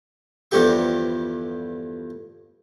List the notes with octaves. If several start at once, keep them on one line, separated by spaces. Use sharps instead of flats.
E2 G2 D3 F3 G4 C#6